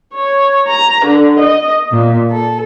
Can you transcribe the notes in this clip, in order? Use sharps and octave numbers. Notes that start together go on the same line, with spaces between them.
C#5
A#5
D3
D#5
A#2
A4